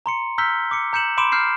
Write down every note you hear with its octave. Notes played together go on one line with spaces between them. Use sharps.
A#5 C6 C#7
A#5 E6 F6 G6 B6 G7
D6 C#7
A#5 G6 C#7 E7 F#7
B5 C6 D6 D7 E7
C6 F6 G6 C7 C#7